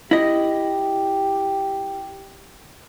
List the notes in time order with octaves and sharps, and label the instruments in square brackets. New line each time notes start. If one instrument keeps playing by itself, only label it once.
[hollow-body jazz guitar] E4 D#5 [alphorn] G4